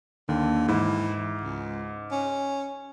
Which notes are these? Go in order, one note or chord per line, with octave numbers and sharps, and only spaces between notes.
D#2 D3
G#2 E3
C#2
C#4